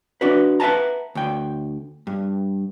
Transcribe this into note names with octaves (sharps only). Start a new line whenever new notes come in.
D4 F#4 B4
B4 E5 F#5 A5 A#5
D2 G5
G2